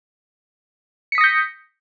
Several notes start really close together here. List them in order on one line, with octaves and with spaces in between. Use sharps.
C#7 B6 D#6 A#6 G6